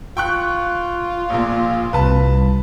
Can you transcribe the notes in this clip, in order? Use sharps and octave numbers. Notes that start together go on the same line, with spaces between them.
F4 G5 C#6 F#6
A#1 A#2
C2 B4 A5